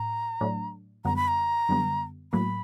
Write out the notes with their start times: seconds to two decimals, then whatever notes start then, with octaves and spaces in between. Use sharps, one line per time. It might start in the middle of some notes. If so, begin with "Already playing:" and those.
Already playing: A2 A#5
0.41 A2 F#3 A3 D4
1.05 F#2 D3 G3 B3 A#5
1.16 B5
1.28 A#5
1.69 F#2 D3 G3 B3
2.32 A2 F#3 A#3 B5